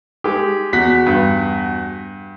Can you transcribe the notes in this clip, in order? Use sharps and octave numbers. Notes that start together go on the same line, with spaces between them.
G#3 G4
E2 F#4 B6
G2